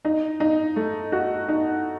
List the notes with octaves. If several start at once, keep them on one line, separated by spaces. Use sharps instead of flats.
D#4
D#4
A3
F#4
D#4